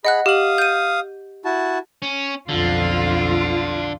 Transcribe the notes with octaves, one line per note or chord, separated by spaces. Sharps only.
G#4 D#5 F#5 B5 F#6
G4 F5 D#6 F#7
G6 D#7
E4 F#4 A5
C#4
B1 F2 D3 F4